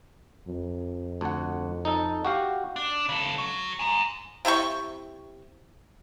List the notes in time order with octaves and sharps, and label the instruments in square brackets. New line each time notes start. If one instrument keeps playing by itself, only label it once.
[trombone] F2
[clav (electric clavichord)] D2 F#5
D#4 A4
F#4 G4 F5
[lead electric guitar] D4
C#3 A4
F#3
G#5 A#5
[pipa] C3 E4 G5 C#6